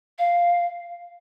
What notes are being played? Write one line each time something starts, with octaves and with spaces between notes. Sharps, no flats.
F5